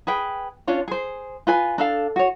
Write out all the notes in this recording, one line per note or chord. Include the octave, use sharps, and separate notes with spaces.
G#4 B4 G5
C#4 D4 F4 C#5
G#4 C5
F4 B4 G#5
D4 A4 F5
F#4 C#5